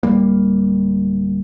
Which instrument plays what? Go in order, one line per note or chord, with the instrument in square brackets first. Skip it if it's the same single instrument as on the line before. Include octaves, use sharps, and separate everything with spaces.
[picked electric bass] D1 D#2 G3 A#3